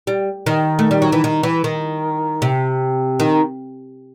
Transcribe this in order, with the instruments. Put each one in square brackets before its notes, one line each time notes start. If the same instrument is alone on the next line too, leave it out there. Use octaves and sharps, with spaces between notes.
[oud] G3
D#3
A3
G3
F#3
E3
D#3
E3
D#3
C3
D#3